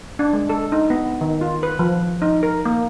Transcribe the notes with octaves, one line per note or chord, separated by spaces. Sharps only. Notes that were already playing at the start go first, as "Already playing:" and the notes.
D4
G#3
A4
D#4
B3
D#3
F4
B4
F3
D#4
A#4
A#3